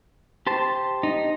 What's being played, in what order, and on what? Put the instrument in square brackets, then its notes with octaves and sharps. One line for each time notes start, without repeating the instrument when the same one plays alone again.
[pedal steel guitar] G4 C5 A5
[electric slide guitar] D#4